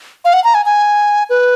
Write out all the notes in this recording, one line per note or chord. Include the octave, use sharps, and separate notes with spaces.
F5
F#5
A#5
G#5
G#5
B4